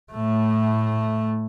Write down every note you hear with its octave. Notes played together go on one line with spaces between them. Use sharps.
A2 A3